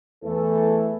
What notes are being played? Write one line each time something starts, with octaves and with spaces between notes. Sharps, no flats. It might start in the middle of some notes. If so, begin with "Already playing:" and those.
E2 E3 A3 A4